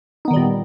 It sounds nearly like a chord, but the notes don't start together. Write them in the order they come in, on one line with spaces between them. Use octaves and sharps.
D#4 B3 D#3 G3 A#2